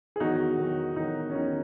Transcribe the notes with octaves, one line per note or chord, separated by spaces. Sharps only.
G#4
E2 D#3 F#3 D#4 F#4
E2 D#3 F#3
E2 D#3 F#3 D#4
C#4
E2 D#3 F#3 D#4